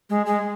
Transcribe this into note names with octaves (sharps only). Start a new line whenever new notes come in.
G#3
G#3